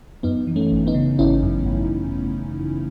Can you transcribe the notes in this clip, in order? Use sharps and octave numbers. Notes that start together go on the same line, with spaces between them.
F#2 B3 D#4
E3
A3 C#4
G#1
B3 D#4
C#3
G#1 C#4 E4
F#2
G#1